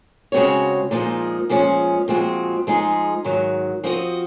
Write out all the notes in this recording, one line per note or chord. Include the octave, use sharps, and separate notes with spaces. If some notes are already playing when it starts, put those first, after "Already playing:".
C#3 G#3 C4 F#4 C#5
A#2 F3 G#3 D#4
A#2 F3 G#3 C#4
A#2 F3 G#3 C4 F#4
F3 G#3 D#4 G#4
G#2 D#3 F#3
F3 C4 F#4 A#4 D#5